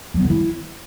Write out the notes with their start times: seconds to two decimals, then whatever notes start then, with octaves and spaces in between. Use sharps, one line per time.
0.14 F#3
0.20 B3
0.25 D3
0.30 E4